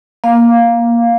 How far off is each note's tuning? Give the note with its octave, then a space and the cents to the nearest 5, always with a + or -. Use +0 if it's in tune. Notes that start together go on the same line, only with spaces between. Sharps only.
A#3 +15 F5 +0